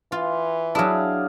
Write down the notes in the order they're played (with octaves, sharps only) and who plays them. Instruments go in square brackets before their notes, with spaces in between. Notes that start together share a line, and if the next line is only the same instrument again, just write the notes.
[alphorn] E3 [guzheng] F4
[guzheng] F#3 E4 [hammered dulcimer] D4 G#4 F5